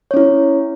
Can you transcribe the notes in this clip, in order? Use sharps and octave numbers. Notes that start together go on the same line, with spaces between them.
C#4 E4 C#5